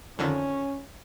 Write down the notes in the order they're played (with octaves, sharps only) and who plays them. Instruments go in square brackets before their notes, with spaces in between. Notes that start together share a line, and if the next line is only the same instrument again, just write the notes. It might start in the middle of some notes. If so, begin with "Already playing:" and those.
[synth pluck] F2 D3 D#3 [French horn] C#4